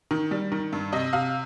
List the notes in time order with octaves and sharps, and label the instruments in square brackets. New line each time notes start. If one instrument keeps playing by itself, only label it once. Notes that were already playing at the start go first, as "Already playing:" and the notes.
[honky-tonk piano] D#3
G3
D#3
G2
C3 D#5
C3 F5